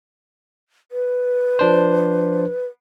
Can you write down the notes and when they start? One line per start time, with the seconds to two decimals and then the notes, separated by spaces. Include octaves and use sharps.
0.92 B4
1.59 F3 D4 C5